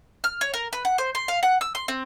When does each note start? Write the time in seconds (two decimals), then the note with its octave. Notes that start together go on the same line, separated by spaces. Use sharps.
0.24 F6
0.41 C#5
0.54 A#4
0.73 B4
0.85 F#5
0.98 C5
1.15 C6
1.28 F5
1.43 F#5
1.61 E6
1.75 C6
1.88 C4